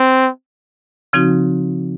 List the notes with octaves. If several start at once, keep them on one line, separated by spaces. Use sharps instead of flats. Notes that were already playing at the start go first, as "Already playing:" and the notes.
Already playing: C4
C#3 F3 C4 D#4 F#4